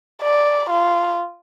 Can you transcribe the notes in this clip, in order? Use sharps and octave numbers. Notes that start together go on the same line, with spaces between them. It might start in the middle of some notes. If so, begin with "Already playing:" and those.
D5
F4